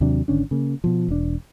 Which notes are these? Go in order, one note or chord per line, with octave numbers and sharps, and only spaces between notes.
D#2 C3 F#3 D4
G#1 D3 C#4 D4
C#3 A#3
B2 F3
E1 D4